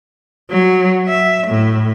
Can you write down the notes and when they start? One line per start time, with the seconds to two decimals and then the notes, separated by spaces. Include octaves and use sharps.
0.50 F#3
1.07 E5
1.47 A2